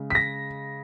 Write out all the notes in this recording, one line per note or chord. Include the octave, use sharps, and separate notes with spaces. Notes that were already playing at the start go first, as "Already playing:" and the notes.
Already playing: C#3 G#3
B6
A#6